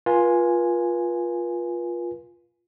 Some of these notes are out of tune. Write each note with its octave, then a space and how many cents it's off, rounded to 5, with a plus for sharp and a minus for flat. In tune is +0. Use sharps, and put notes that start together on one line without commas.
F4 +0 B4 -40 G#5 +0